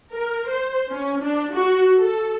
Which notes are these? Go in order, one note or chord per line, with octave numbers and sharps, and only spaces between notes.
A#4
C5
C#4
D4
F#4
A4